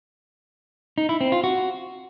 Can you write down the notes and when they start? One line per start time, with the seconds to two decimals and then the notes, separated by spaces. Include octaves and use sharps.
0.98 D#4
1.09 E4
1.21 C4
1.32 F4
1.44 F#4